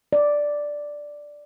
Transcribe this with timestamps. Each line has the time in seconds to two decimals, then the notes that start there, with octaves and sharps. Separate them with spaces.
0.13 D5